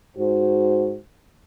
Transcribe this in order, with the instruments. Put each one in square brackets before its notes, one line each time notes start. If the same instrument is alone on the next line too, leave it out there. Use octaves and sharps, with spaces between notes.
[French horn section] G#2 F#4 C5